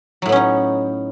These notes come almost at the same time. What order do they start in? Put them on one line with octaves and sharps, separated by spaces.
F#3 A2 B3 C#4 D#4